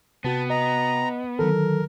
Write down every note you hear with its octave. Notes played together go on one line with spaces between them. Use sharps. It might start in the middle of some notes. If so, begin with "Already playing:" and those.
C3 B3 F#4 G5 A5
D#5 A#5
D3 D#3 F#3 A4 A#4